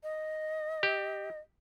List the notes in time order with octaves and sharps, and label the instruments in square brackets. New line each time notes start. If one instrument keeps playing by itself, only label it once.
[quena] D#5
[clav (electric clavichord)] G4